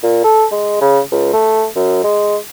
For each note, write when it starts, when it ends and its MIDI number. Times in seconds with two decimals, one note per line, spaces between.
0.03 0.23 46
0.24 0.45 69
0.51 0.78 56
0.81 1.00 49
1.11 1.29 37
1.33 1.66 57
1.76 2.02 42
2.04 2.37 56